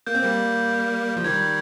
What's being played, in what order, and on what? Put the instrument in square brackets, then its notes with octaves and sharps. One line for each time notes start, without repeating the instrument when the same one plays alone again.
[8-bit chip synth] A#3 [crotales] G6
[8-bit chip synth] C4
G3 A#3
F3
[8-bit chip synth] D#3 G3 [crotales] G#6